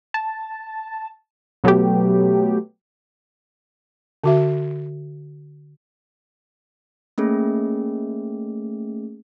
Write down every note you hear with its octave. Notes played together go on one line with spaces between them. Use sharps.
A5
B2 F#3 A3 B3 G4
D3 F#4 E5
A3 A#3 C#4 G#4